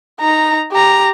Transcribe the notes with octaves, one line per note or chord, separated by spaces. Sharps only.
D#4 A#5
G4 A#5